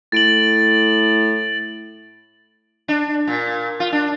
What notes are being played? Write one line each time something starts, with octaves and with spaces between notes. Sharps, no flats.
A2 A6 D7 F#7
D4
A#2
F4
D4